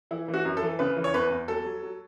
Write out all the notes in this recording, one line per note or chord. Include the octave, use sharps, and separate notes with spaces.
E3 E4
E3
F#4
F#2
A4
E3
C#3 B4
E3
C#5
E2 B4
E2
F#3 A4
F#3
F#3